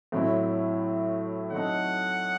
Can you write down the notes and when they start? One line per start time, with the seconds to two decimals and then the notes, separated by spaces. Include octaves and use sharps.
0.12 A2 F#3 C4 E4
1.52 F#3 A3 C4 D#4 A4 F#5